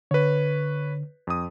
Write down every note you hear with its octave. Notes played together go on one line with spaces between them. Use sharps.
D3 B4 C#5
F2 D#6